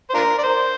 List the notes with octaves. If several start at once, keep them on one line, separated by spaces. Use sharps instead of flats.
C5
D4 F4 A#4
D5
C5